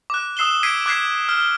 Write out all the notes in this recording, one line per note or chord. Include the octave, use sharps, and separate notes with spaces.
D6 F#6
D#6 E6 C7 E7 G7
E6 G#6 B6 C7 D7 D#7
D6 F#6 G#6 B6 C7
F6 G7